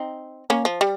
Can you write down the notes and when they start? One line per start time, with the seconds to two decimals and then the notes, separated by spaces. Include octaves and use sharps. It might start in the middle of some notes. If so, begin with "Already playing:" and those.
Already playing: C4 D#4
0.50 A#3 C#4
0.65 F3
0.81 G3